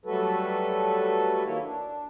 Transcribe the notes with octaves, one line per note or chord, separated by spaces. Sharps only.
F#3 G3 A3 F#4 A4 B4
D#3 F#3 A#3 E4 C#5
D4